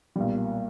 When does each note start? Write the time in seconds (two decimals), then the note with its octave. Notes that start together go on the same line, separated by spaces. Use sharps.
0.16 B1 A#2 G3